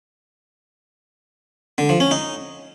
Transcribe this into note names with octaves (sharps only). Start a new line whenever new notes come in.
D3
F3
C#4
D#4